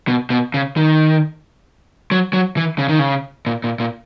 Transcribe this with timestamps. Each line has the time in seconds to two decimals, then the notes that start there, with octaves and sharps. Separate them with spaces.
0.08 B2
0.30 B2
0.54 C#3
0.77 D#3
2.11 F#3
2.33 F#3
2.57 E3
2.78 C#3
2.89 D#3
2.99 C#3
3.47 A#2
3.64 A#2
3.80 A#2